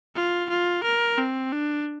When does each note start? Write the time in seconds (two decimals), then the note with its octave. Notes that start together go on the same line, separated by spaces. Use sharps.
0.15 F4
0.49 F4
0.83 A#4
1.18 C4
1.52 D4